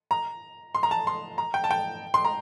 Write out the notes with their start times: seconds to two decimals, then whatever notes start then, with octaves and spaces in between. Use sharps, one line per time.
0.11 A#5
0.75 C6
0.83 A#5
0.91 A5
1.07 C6
1.38 A#5
1.54 G5
1.64 A5
1.71 G5
2.14 C6
2.25 A#5